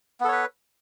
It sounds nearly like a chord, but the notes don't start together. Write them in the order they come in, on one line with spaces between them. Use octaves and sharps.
B3 A4 C#5 B4